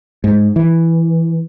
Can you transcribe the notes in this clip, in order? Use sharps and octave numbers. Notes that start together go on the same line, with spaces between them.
G#2
E3